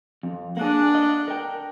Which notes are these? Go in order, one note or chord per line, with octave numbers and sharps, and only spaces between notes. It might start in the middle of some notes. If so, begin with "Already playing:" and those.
F2
A#3 D4 G#4 F#5
D#5
A#4 G5